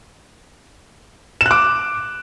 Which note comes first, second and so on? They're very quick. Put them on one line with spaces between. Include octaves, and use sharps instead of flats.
E7 F#6 D6